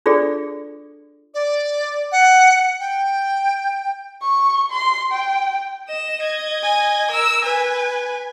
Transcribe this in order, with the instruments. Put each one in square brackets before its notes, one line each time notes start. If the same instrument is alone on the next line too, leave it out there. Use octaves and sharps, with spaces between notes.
[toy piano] D4 F4 G#4 A4 D5
[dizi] D5
F#5
G5
[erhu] C#6
C6
G5
[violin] D#5 E7
D#5 G#6
[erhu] G#5
[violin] A#4 [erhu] E6
[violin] B4 [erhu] G#5